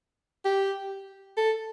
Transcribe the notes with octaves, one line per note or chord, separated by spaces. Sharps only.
G4
A4